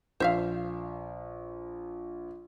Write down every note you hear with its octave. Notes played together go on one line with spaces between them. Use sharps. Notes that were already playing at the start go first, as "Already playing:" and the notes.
A#1 C5 E5 F5